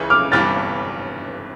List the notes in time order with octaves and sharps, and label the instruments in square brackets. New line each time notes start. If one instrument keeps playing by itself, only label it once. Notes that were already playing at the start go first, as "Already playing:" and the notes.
Already playing: [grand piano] C#2 C#3 E3
[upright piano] D6 F6
[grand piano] G1 G2 E3 G3 [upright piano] F6 A6